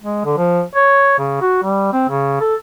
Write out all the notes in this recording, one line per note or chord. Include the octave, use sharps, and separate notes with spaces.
G#3
D3
F3
C#5
C#3
F#4
G3
C4
C#3
A4